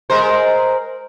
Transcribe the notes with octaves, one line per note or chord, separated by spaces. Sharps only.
G#3 A#4 C5